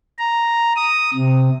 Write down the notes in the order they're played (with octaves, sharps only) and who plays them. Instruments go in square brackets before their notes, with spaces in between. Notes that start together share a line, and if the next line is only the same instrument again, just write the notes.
[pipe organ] A#5
D#6
C3